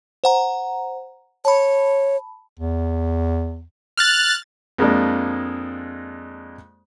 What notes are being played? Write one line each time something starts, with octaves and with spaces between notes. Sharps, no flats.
C5 F#5 A#5
C#5 A5 B5
E2
F6 F#6 A6
F2 G#3 A#3 D4